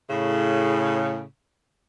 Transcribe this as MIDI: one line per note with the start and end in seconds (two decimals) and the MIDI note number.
0.10 1.23 45
0.10 1.23 49